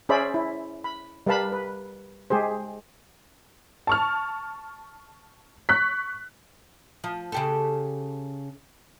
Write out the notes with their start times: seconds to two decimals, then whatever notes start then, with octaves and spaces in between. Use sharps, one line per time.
0.09 C#4 G#4 C5 D5 E5 B5
0.34 E4
0.84 B5
1.26 G3 A#4 B4 F5 A5 B5
1.52 B4
2.30 G#3 G4 G#4 C5
3.87 A5 C#6 F6
5.69 C#6 F#6 B6
7.04 F3
7.32 C#3 G4 A4